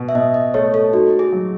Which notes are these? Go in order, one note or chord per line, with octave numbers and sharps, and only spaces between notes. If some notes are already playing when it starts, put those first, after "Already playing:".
Already playing: B2
E5
B2 D#5
D#5
A3 C#5
A4
D#4 F#4
G#4
F#3